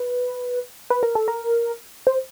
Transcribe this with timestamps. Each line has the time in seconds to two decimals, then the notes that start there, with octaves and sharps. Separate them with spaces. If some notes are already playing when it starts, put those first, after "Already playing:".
Already playing: B4
0.90 B4
1.03 A#4
1.15 A4
1.28 A#4
2.07 C5